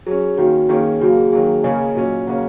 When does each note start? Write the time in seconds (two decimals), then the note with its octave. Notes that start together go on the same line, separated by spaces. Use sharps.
0.07 F#3 C#4 G#4
0.38 D#3 A#3 C#4 F#4
0.69 D#3 A#3 C#4 G#4
1.01 C#3 F#3 A#3 F#4
1.16 G#4
1.32 D#3 F#3 A#3 G#4
1.63 C#3 A#3 C#4 D#5 G#5
1.95 A#2 F#3 C#4
2.27 C#3 F#3 A#3 C#4 F#5 A#5